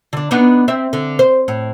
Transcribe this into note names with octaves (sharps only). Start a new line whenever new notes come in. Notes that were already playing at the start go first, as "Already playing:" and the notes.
D3 D4
B3 D4 D#4
C4 E5
D3
C5
A2